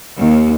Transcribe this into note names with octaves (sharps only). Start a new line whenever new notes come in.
D#2